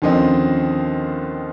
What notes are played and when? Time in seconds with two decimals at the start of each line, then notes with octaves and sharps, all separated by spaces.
0.02 D#2 D3 F3 C4 C#4 D#5